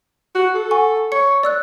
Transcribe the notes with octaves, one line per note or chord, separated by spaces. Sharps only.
F#4
A4
F#5 G#5 C#6
C#5 C#7
D5 E6 F#6